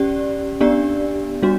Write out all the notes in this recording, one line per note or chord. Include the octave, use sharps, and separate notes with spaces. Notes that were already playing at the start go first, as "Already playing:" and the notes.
Already playing: C#4 G4 D5
B3 D4 G4 D5
G3 D4 F#4